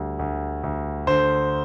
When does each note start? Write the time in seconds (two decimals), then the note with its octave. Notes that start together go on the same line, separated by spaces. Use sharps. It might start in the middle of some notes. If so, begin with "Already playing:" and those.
Already playing: D2 G3
0.19 D2
0.63 D2
1.07 D3 C5